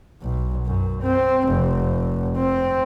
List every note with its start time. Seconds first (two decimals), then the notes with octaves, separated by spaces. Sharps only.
0.22 B1
0.66 F#2
1.02 C4
1.48 F1
2.36 C4